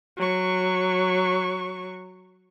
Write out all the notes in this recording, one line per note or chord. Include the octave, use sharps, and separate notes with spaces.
F#3 C#6